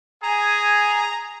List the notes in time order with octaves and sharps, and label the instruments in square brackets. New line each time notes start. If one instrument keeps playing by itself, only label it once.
[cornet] G#4 [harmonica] G#5 A#5